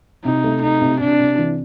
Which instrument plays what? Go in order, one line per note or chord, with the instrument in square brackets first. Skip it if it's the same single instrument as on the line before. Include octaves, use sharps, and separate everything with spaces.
[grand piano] C3 [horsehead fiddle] D#4
[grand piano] A3
[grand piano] C3 [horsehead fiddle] D#4
[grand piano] C3
[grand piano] C3 [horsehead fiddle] D4
[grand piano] C3
E3